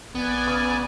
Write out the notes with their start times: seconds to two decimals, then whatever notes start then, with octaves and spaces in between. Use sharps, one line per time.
0.15 A#1 B3 D5 G#5
0.46 C#3